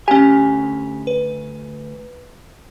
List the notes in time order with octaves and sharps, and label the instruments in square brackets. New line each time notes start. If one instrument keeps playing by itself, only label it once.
[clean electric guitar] D2 G#5 [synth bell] C#4 G4
[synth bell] B4